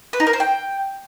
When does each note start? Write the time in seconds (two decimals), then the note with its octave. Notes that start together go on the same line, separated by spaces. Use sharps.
0.13 B4
0.20 D#4
0.27 A#4
0.33 C5
0.40 G5